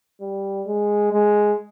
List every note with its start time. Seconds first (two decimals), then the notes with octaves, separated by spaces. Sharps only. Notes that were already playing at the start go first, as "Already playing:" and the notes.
0.21 G3
0.67 G#3
1.12 G#3